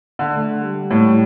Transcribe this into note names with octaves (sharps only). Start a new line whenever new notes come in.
D3
A3
G3
A2